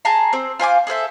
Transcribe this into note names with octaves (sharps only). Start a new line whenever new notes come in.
G#4 A5 A#5 C6
C4 C5
F4 C5 G#5 D6
G#4 A4 C5 E5